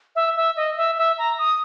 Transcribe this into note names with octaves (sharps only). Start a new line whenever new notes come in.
E5
E5
D#5
E5
E5
A#5
D#6